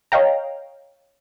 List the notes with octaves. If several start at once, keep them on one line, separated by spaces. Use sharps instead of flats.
C#5 D#5 F5 G5 A#5